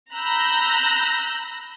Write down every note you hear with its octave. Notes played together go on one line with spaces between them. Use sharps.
A#5 B5 E6 F#6 G6 A#6